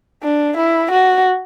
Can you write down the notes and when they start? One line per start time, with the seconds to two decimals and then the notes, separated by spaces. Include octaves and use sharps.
0.23 D4
0.57 E4
0.91 F#4